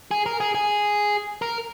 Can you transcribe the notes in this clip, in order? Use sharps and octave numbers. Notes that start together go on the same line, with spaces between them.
G#4
A#4
G#4
G#4
A#4